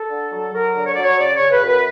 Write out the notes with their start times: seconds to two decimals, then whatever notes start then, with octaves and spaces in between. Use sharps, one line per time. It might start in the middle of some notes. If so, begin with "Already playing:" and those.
Already playing: A4
0.10 D3
0.32 F#3
0.53 F#3 A#4
0.74 D3
0.85 C#5
0.94 F#3 D5
1.03 C#5
1.19 C#3 D5
1.35 C#3 C#5
1.52 B4
1.61 F#2
1.67 B4